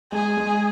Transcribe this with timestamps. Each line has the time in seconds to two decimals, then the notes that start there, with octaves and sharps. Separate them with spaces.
0.12 G#3 G#4
0.37 G#3